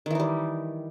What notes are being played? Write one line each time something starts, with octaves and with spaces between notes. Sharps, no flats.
D#3 E3 G3 D#4